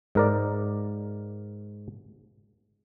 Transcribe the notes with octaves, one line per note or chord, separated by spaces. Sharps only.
G#2 A#4 D5